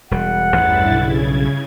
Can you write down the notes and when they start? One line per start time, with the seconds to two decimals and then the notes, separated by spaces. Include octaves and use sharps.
0.11 E1 G3 F#5
0.54 A1 E2 G2 E4 A6
0.91 B1 C#3 G#6